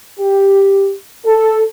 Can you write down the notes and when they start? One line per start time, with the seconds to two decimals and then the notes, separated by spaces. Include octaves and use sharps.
0.19 G4
1.25 A4